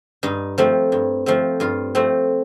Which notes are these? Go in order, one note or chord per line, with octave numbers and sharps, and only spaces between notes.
G2 D#4
F3 A3 C4
G2
F3 A3 C4
G2 F4
F3 A3 C4